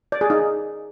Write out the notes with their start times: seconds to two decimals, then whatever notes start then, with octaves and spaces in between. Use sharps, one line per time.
0.12 D5
0.21 G#4
0.30 D#4